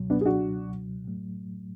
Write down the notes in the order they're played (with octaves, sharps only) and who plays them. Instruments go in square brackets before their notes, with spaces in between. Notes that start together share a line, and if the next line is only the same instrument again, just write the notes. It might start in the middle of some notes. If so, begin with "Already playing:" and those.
Already playing: [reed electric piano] C#2 B2 F#3
[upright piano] B3 D4
G#4
D4 F#4
[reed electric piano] A2 F#3 A3